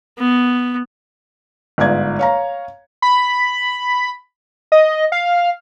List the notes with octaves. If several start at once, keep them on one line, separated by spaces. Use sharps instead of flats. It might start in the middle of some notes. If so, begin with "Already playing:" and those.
B3
G1 G#2 F4 D5 G#6
C#5 F5 A#5
B5
D#5
F5